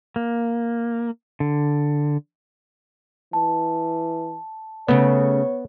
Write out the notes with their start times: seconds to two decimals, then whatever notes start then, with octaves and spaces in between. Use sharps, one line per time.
0.16 A#3
1.40 D3
3.33 E3 A5
4.88 C#3 A3 B3 C#5